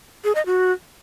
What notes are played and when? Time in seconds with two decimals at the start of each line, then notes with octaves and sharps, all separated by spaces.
0.24 G#4
0.35 D#5
0.46 F#4